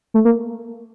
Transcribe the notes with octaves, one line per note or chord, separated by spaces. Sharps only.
A3
A#3